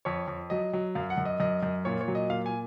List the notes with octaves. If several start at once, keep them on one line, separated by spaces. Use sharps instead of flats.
F2 C#5
F2
F#3 D#5
F#3
F#2 F5
F#5
F#2
D#5
F#2 D#5
F#2
A#2 C#5
C#5
F#3
D#5
A#2 F5
G#5